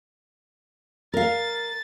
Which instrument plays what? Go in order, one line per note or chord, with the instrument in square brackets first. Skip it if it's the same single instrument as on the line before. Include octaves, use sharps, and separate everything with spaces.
[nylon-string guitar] A#4 F5 [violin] A6